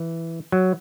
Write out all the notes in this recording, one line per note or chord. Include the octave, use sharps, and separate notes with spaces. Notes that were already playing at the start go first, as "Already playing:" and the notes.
Already playing: E3
F#3